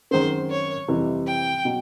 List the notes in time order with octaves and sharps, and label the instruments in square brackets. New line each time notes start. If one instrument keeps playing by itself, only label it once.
[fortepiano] F#2 D#3 G#3 C4 [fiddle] C5
[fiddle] C#5
[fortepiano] F2 C3 E3 G3
[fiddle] G5
[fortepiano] B2 F#3